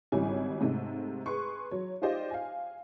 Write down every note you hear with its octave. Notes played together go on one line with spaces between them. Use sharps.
G#1 C#3 G3 E4 C#5 G#5
G#2 C3 G#3 A3
G#4 B4 C6 C#6
F#3 C#5
D#4 F4 G4 C5 D5 D#5
F5 G#5